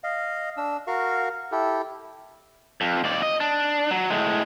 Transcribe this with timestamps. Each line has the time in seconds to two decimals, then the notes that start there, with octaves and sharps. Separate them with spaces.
0.04 D#5 F5
0.57 D4 E6
0.87 F#4 A#4 F5 C#6
1.52 E4 G4 A4
2.81 F2
3.04 D#2 D5
3.23 D#5
3.40 D4
3.91 F#3
4.10 A2 G#3